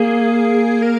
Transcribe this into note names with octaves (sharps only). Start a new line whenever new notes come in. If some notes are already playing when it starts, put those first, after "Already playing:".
Already playing: A#3 G#4
A#4